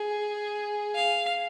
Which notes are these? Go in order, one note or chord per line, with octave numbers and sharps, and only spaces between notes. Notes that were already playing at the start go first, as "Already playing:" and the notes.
Already playing: G#4
F5